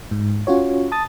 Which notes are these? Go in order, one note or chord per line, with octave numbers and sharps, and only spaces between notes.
G#2
C#4 F4 F#4 C#5
A5 D#6 A6